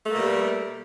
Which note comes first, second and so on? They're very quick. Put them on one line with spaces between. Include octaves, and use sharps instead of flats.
A3 A#3 B2 G3